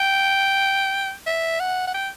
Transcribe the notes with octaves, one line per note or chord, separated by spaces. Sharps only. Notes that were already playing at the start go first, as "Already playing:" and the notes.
Already playing: G5
E5
F#5
F#5
G5